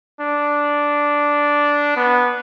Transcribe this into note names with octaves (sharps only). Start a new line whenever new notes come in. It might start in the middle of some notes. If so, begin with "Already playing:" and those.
D4
B3